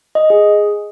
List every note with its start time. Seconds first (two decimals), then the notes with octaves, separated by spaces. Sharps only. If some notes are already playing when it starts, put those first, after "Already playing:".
0.15 D#5
0.30 G#4